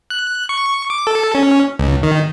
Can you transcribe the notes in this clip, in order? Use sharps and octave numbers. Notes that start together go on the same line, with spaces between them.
F#6
C#6
D6
A4
C#4
C#2
D#3